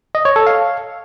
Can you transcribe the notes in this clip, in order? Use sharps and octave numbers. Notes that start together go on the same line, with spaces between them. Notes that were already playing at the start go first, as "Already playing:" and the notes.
D#5
C#5
A4
F5